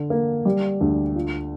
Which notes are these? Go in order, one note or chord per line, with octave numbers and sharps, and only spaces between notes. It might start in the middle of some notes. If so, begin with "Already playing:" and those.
Already playing: D3
A#3
G3
D2
F4